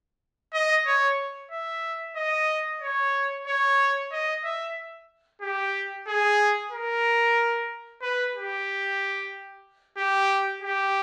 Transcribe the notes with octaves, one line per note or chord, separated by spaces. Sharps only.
D#5
C#5
E5
D#5
C#5
C#5
D#5
E5
G4
G#4
A#4
B4
G4
G4
G4